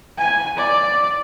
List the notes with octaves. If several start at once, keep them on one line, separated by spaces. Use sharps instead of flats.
G#5
D5